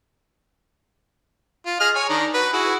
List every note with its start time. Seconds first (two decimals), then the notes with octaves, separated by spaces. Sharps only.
1.66 F4
1.80 G#4 D#5 F6
1.95 C#5 G#5
2.09 D#3 D4 A#5
2.34 F#4 B4
2.53 E4 F#4 G#4